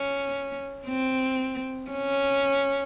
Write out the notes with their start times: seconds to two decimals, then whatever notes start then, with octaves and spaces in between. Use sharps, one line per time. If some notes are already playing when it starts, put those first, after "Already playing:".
Already playing: C#4
0.87 C4
1.91 C#4